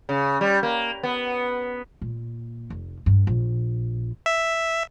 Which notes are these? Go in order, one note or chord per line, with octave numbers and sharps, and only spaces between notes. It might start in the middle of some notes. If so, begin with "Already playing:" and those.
C#3
G3
A#3
B3
A#2
F1
G2
A#1
E5